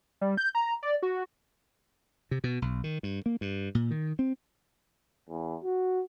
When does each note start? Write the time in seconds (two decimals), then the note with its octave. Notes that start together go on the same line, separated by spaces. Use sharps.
0.21 G3
0.37 G6
0.55 A#5
0.83 D5
1.02 F#4
2.31 C3
2.44 B2
2.62 B1
2.84 D#3
3.03 G2
3.26 A#3
3.41 G2
3.75 A#2
3.91 D#3
4.19 C4
5.29 E2
5.64 F#4